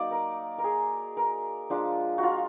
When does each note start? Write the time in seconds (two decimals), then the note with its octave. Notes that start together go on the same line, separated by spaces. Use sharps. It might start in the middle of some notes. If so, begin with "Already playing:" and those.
Already playing: F#3 A#3 D#4 D5
0.11 A#4
0.58 A#4
0.64 G#4
1.17 A#4
1.70 F3 G#3 D4 F4
2.18 F#4
2.23 F4